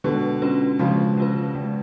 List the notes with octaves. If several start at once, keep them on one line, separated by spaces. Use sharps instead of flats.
B2 D3 G#3
C#4 F4 B4
C#3 F3 G#3
C#4 F4 B4
G#3